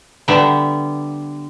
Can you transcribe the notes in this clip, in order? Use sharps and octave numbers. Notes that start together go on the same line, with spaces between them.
D3 G3 B3 E5